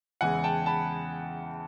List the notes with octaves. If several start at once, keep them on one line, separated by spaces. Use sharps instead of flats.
E2 C#3 E3 G#3 F#5 G#5
G5 A5
A5 B5